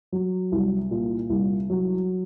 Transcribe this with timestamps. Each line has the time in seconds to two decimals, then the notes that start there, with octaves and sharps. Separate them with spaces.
0.12 F#3
0.52 C2
0.91 A#2
1.30 C2
1.70 F#3